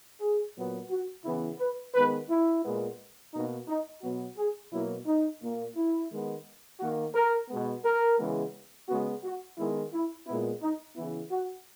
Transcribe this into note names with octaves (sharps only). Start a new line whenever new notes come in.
G#4
A#2 F#3 B3
F#4
C#3 E3 B3 E4
B4
D#3 G#3 B3 B4
E4
A#2 G#3 B3
B2 A#3 D#4
D#4
B2 F#3 B3 F#4
G#4
B2 F#3 A#3 E4
D#4
A#2 A#3
E4
D#3 G#3 B3
D#3 A#3 F#4
A#4
B2 G#3 B3
A#4
C#3 E3 G#3 B3
C#3 G#3 B3 F#4
F#4
D#3 G#3 B3 E4
E4
A#2 G#3 B3 E4
D#4
C#3 E3 B3 E4
F#4